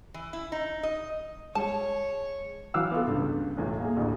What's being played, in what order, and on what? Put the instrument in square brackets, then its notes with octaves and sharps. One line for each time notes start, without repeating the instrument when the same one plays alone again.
[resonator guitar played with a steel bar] E3
E4
D#4
D#5
[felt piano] G#3 G#4 [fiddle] C#5 [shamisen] A5
[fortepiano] E3 F#3 F5 D6 E6 F#6
B3 F4 A4
C#2 G2
B1 E2 A2
A#3 G#4
A1 D2